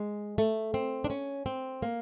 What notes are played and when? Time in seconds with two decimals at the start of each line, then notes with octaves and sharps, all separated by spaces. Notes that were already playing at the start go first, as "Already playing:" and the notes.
Already playing: G#3
0.38 A3
0.74 C4
1.04 D4
1.10 C#4
1.46 C4
1.82 A#3